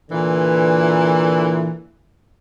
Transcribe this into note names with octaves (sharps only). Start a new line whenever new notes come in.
A#2 D3 E3